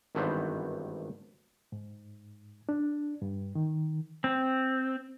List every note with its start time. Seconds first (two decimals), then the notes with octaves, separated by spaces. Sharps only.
0.15 G#1 G2 D#3 E3 B3 C5
1.72 G#2
2.69 D4
3.22 G2
3.55 D#3
4.24 C4